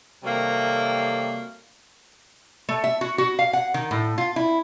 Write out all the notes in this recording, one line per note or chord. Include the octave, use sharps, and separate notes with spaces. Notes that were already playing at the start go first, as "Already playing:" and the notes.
C3 D#3 F#3 G3 A3 A#3
A3
E5
F#4
F#4
F5
F#5
D#3
A2
F4
E4